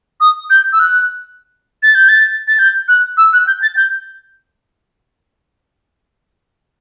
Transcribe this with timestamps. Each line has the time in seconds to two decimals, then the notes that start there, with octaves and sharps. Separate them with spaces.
0.20 D#6
0.50 G6
0.73 E6
0.80 F#6
1.83 A6
1.95 G6
2.09 A6
2.47 A6
2.59 G6
2.88 F#6
3.17 E6
3.33 F#6
3.47 G6
3.62 A6
3.77 G6